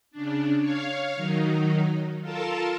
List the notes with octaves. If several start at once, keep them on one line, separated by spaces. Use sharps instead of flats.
C#3 D4
C#5 F5
D#3 F#3 D#4
F4 A4 A#4 A5